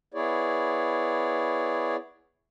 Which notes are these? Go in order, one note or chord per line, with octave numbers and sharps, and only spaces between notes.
B3 E4 G#4 C#5 D5